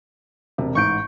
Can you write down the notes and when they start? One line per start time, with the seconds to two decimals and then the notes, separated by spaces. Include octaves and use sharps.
0.58 E1 C3
0.75 A1 G#2 C#6 G6 D7